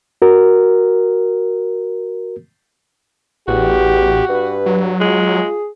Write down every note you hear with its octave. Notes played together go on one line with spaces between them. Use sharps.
F#4 A#4
A1 E2 F#4 G4
G2 B4
F#3
G#3 F4
G#4